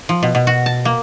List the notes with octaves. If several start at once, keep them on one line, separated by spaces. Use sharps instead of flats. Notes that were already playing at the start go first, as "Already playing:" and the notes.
F3
B2
B2
F#4
A5
A#3